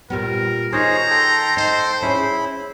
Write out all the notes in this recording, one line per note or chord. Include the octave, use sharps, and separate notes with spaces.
A#2 G3 B3 A#4
D#3 D#4 G#4 C5 C#5 A#5
A4 G5 C6
D#4 C5
C#4 E4 G#4 B5